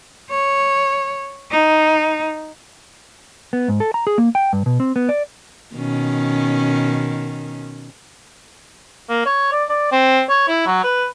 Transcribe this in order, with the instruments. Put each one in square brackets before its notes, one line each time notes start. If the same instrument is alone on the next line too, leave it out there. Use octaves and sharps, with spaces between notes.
[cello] C#5
D#4
[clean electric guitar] B3
G#2
A4
A#5
G#4
A#3
G5
G2
B2
C4
B3
D5
[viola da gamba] B2 D#3 C#4
[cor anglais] A#3
C#5
D5
D5
C4
C#5
E4
F#3
B4